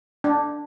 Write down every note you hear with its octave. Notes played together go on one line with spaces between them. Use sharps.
D4